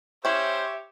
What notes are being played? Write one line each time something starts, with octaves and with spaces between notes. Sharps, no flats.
C#4 E4 G4 C5 C#5 E5